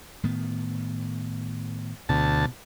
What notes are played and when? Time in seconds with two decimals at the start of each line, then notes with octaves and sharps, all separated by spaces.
0.23 A2 D#3 B3
2.09 D2 B2 A5